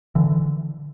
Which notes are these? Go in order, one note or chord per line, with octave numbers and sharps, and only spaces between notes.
D3 E3